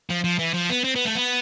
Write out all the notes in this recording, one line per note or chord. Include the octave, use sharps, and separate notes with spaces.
F3
F3
E3
F3
B3
C4
B3
A3
B3